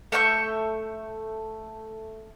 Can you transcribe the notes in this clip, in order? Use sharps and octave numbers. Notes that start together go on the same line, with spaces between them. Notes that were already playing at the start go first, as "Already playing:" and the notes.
A3 E5 C#6 G6